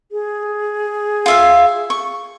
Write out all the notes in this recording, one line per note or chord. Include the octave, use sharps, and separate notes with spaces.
G#4
F4 E5 F5
C#6